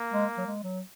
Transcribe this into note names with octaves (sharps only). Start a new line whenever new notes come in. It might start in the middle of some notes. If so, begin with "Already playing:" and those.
Already playing: A#3
G#3
F#3
G#3
F#3